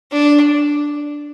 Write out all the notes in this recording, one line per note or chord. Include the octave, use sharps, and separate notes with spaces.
D4